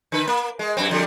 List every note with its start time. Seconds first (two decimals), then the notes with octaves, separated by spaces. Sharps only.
0.12 D3 B4
0.27 A#3
0.59 G#3
0.77 F#2 C4
0.90 F2 D3 G3